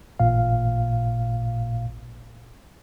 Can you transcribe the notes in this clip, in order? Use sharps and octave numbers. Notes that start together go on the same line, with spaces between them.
A1 A#2 F5